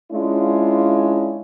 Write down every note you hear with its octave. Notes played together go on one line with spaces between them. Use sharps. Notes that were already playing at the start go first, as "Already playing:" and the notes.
G#3 C#4 D4 E4 F4